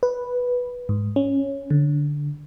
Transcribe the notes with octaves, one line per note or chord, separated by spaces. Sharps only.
B4
G#2
C#4
D3